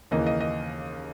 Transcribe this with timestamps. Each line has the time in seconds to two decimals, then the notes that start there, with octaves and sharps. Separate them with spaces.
0.11 D#2 C#3 E3 A#3 D#5
0.27 D#5
0.41 D#5